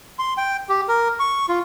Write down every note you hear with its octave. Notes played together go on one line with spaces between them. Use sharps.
C6
G5
G4
A#4
C#6
F4